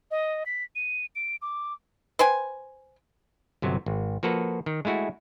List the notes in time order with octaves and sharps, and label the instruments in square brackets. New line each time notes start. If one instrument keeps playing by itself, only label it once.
[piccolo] D#5
B6
D#7
D7
D6
[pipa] B4 C5 G5 G#5
[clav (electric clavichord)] G1 C3 F#3
G#1
F3 A#3 F#4 A4 B4
D#3
G#3 A3 E4 F#4